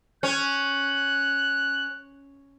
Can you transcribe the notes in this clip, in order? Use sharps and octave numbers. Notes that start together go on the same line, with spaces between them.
C#4 F#6